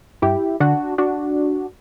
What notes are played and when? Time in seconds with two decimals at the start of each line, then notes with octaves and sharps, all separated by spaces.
0.22 G2 E4 G4
0.60 D3 D4 F#4
0.98 D4 F#4